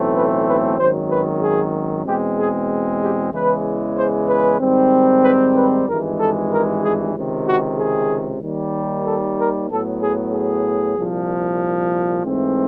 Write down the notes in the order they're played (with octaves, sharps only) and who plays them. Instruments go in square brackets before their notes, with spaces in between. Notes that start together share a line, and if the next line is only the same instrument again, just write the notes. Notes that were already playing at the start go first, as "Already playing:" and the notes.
Already playing: [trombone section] B1 A2 E3 A3 C4
B4
B4
G#1 F#2 D#3 F#3 C5
B4
G#4
E2 B2 G#3 C4 G4
G#4
G4
E2 C#3 E3 G#3 B4
C5
B4
G#2 D#3 G3 C4
B4
B4
G#1 G2 E3 G#3 A#4
A4
A#4
G#4
C#2 C3 D#3
F#4
G#4
D#2 D#3 G3
A4
A#4
A2 F#3 B3 A4
G#4
G#4
C2 A#2 F3
G#2 E3 A3 C4